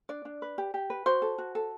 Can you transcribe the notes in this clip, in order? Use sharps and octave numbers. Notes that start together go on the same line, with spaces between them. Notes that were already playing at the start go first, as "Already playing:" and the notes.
D4 D5
D4
B4
G4
G4
B4
F#4 C5
A4
F#4
A4